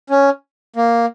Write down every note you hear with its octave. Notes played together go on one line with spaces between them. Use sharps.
C#4
A#3